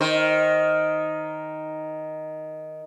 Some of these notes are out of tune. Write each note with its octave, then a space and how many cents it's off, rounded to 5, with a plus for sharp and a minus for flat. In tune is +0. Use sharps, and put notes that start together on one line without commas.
D#3 +0 C5 +0